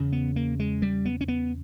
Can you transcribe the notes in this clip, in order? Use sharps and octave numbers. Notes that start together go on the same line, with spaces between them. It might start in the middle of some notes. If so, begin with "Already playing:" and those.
Already playing: E2 C#3
B3
A#3
G#3
G3
B3
C#4
B3